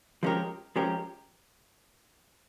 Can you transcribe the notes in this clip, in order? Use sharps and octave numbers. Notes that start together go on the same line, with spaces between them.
F3 G#3 C#4 G4 A#4
F3 G#3 C#4 G4 A#4